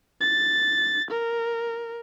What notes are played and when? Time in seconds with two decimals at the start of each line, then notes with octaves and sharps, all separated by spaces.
0.21 A6
1.11 A#4